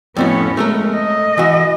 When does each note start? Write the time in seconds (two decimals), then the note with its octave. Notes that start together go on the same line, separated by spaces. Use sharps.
0.17 F2 A2 B3 C#4 F#4
0.57 G#3 A3 A4 A#4
0.96 D#5
1.38 E3 F#4